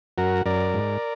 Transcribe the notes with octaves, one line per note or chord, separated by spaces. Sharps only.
F#2 F#4 A#4
F#2 A#4 D5
G#2